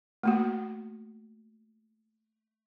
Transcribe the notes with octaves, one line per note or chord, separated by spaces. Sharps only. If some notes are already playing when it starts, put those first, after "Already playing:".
A3 A#3 F#4